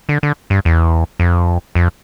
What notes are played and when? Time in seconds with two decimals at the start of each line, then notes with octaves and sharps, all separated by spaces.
0.09 D3
0.23 D3
0.50 G2
0.65 E2
1.20 F2
1.75 F2